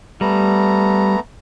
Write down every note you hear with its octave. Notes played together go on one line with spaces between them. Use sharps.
G3 A3 B3 A#5